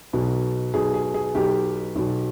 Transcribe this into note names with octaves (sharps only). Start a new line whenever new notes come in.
B1 B2
B1 B2 G#4
G#4
G#4
B1 B2 G4
B1 B2